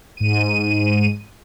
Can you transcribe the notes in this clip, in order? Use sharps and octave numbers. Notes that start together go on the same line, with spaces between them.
G#2 D#7